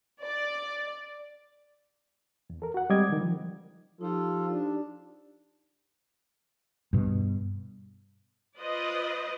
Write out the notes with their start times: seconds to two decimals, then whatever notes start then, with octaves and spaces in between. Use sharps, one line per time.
0.24 D5
2.50 E2
2.62 A4 A#4
2.74 F#4 F#5
2.90 G3 G#3 C4 D#5 D6 G#6
3.09 D3 D#3
3.21 F3
4.01 F3 D#4 F4 G4 A4
4.50 D4
6.93 G2 B2
8.59 F4 B4 C5 D5 D#5